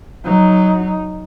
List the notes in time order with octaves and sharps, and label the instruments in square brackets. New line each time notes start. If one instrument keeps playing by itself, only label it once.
[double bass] F#3 D#4